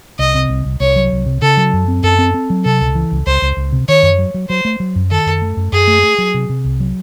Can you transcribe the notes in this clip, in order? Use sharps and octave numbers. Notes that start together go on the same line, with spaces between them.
C2 D#5
C3
C2
C2
C2 C#5
F#3
C2
C3
C#3 A4
F#3
F#2
C4
F#2 A4
C4
C4
F#3
C3 A4
C#2
E3
C#2
C#2 C5
C#2
C#2
C3
D#3 C#5
F#2
F#3
F#3
F#3 C5
A3
F#3
F#2
D#3 A4
F#2
A3
F#2
F#2 G#4
A3
A3
F#3
C3
C3
C2
F#3